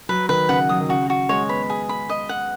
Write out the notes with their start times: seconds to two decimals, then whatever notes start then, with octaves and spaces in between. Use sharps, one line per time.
0.09 F#3 B4
0.29 D#3 B4
0.49 C#3 F#5
0.69 F#3 D#6
0.80 D#3
0.89 C#3 F#4
1.10 F#4
1.29 G#3 C#5
1.49 B3 B5
1.70 G#4
1.89 B5
2.09 D#5
2.29 F#5